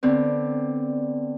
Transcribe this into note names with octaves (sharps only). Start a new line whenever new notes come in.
D3 B3 C4